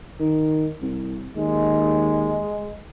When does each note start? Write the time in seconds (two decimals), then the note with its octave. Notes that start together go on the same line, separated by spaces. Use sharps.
0.19 D#3
0.82 C2
1.36 D#2 G#3